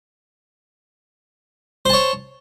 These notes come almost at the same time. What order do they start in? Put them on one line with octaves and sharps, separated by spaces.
C5 A5 C#5